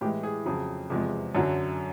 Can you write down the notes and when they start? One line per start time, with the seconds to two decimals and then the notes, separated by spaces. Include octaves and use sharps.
0.01 A2 E3 G#3 G4
0.23 G#4
0.45 F2 C#3 F#3 G#4
0.90 E2 C3 F3 G#3
1.35 F#2 D3 F#3